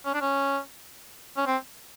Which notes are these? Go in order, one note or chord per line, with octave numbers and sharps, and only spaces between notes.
C#4
D4
C#4
C#4
C4